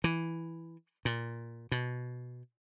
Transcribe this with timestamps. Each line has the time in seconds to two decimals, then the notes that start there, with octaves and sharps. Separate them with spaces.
0.04 E3
1.05 A#2
1.72 B2